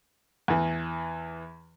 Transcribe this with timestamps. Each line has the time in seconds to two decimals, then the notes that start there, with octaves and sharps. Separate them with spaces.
0.48 E2 E3